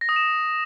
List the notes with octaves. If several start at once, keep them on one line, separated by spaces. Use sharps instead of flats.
A#6
D#6
E7